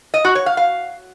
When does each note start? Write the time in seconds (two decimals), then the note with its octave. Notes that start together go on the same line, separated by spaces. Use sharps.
0.14 D#5
0.25 F#4
0.35 C#5
0.46 F5
0.57 F5